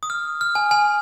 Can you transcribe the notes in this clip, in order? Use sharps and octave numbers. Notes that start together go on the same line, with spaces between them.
D#6
F6
F6
G#5
G#5